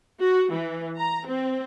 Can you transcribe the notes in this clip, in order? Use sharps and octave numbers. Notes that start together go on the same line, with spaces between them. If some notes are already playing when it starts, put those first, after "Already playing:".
F#4
E3
A#5
C4